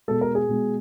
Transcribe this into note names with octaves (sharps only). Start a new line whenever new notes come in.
B2 G#3 A4
A#4
G#4
B2 G#3